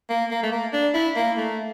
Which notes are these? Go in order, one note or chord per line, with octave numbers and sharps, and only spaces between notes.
A#3
A#3
A3
A#3
D4
E4
A#3
A3